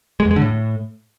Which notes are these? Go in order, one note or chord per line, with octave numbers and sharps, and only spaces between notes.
G#3
E2
G#3
D3
A2